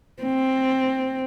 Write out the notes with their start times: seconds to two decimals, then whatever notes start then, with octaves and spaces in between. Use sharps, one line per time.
0.23 C4